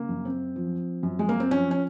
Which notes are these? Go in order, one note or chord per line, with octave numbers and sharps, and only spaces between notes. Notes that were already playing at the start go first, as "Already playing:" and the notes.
Already playing: C#3 A#3
F#2
C4
F3
F#2
G#3
A#3
C4
F3 C#4
C#4